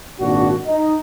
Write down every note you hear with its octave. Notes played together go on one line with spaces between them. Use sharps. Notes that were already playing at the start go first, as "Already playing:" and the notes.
G#1 A#2 D4 F#4
D#4